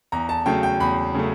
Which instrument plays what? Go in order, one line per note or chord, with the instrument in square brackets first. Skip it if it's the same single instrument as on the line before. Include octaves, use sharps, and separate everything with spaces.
[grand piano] E2 A#5
A5
C#3 F#3 A3 G5
G5
E2 B5
C#3 F#3 A3